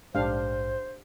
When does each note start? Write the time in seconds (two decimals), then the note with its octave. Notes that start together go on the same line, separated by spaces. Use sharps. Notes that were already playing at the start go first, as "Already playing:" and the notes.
0.15 A#1 G#2 D4 G4 C5 F5